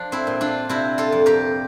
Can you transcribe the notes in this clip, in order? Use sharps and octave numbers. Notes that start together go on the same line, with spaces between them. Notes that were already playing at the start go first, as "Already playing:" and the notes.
Already playing: F3 D4
C4 E4
A#2
D4 F4
C3 C4 E4
F4 A4
F2
G4 A#4